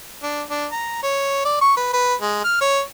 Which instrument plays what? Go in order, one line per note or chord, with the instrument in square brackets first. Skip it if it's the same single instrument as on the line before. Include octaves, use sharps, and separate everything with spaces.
[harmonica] D4
D4
A#5
C#5
D5
C#6
B4
B4
G#3
F6
C#5